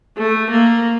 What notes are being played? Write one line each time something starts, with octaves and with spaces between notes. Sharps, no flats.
A3
A#3